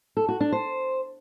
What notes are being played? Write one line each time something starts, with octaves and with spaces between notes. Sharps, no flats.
A4
F#4
D4
C5